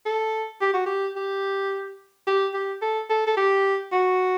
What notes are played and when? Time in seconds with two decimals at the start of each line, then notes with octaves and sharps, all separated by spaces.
0.06 A4
0.61 G4
0.74 F#4
0.86 G4
1.16 G4
2.27 G4
2.54 G4
2.81 A4
3.10 A4
3.27 A4
3.37 G4
3.92 F#4